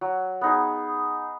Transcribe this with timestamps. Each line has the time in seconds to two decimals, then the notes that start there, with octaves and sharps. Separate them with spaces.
0.01 F#3
0.41 B3 D#4 G#4